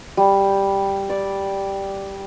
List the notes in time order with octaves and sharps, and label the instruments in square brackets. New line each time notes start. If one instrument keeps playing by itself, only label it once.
[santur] G3
D5